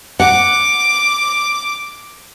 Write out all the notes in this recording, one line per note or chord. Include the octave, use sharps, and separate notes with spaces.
F#5 D6